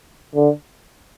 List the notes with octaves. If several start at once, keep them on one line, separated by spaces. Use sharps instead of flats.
D3